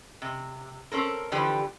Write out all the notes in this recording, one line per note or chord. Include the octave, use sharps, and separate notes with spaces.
C3
C4 C#4 A4 A#4
D3 E3 F3 G3 G4 B4